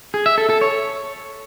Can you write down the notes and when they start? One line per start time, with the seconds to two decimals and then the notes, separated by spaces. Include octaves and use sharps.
0.14 G#4
0.26 E5
0.38 A4
0.50 A4
0.61 C#5